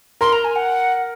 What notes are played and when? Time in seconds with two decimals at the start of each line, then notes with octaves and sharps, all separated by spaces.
0.21 A#4 C6
0.33 A#5
0.44 G#5
0.56 F#5